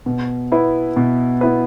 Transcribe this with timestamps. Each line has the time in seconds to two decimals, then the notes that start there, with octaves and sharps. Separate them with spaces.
0.06 B2
0.52 B3 E4 B4
0.96 B2
1.41 B3 E4 B4